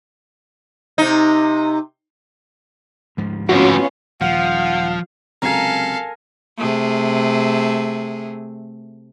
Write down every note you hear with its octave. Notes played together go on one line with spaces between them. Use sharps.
C3 D#4
D2 G#2 F3
F2 A2 B3 C#4 F4 F#4
D#1 F3 F5 F#5
C#2 C3 F#3 A4 A#4 F5 G#5
C3 A3 G#4